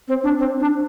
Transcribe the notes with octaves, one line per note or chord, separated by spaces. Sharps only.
C4
D4
C4
D4